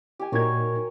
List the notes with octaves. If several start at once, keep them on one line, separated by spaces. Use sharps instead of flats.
G4 G#5
A#2 D#4 F#4 A#4 C#5 G#6